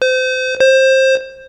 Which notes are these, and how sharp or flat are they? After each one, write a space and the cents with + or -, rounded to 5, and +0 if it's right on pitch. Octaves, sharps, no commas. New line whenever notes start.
C5 -30
C5 +20